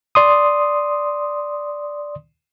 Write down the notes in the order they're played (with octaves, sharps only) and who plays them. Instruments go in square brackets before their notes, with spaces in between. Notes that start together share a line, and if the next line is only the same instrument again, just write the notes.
[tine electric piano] D5 C6 D#6